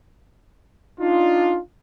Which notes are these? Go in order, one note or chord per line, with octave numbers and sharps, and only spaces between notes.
D4 D#4 F4